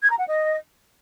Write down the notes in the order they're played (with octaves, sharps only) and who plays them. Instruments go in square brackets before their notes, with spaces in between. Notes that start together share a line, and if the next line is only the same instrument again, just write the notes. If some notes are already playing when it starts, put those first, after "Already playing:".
[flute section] G#6
A#5
F#5
D#5